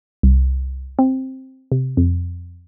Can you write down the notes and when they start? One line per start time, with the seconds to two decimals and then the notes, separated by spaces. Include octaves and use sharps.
0.23 C2
0.99 C4
1.72 C3
1.97 F2